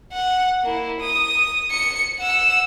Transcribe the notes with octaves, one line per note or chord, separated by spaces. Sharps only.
F#5
A#3 E4
D#6
C#7
F#5 E6